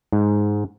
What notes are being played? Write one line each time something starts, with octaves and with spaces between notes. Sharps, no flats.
G#2